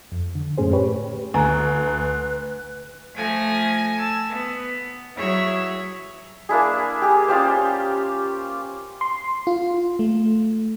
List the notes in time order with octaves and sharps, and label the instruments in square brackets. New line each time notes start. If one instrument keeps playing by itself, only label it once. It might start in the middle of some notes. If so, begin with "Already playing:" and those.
[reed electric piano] F2
D3
F#2 A2 A3 C#4 G#4 C5
G4 B4 C#5
[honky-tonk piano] D2 [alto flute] B4 [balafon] G#5 A#5
[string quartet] F3 A3 G#5 A#6
A5 E6
B3
F#3 E4 G#4 C#5 E5
[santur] A#3 D4 E4 G#4
G4 G#4
C#4 F4 G4 C5
[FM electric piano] C6
F4
A3